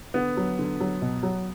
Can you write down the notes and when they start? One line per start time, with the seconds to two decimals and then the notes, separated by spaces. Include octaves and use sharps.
0.14 D3 B3
0.37 F#3
0.59 D3
0.80 F#3
1.02 B2
1.23 F#3